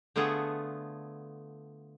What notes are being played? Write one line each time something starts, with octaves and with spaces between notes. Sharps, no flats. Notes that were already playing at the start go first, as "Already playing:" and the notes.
D3 A3 B3 F4 G#4